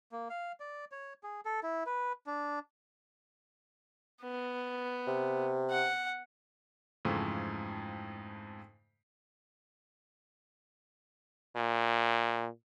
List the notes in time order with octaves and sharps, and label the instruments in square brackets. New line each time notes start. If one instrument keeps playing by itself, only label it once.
[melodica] A#3
F5
D5
C#5
G#4
A4
E4
B4
D4
[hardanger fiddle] B3
[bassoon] C3
[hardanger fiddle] F#5
[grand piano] F2 G#2 C#3 E3 F3 A3
[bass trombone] A#2